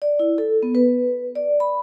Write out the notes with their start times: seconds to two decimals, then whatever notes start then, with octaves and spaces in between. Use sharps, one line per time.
0.02 D5
0.19 E4
0.38 A4
0.63 B3
0.75 B4
1.35 D5
1.60 B5